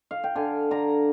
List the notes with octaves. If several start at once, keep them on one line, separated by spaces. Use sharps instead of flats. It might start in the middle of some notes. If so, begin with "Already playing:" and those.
F5
G5
D3 G#5
D3 A#5